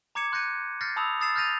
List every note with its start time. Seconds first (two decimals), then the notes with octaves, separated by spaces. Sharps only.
0.15 A#5 D6 G#6 C#7 E7
0.32 C6 F#6 G6 A#6 C#7 D#7
0.81 F6 G6 A6 A#6 C7 C#7
0.96 A5 B5 D#6 E6 F7
1.20 D#6 E6 A6 C7 E7
1.36 F6 G6 A6 A#6 D#7 F7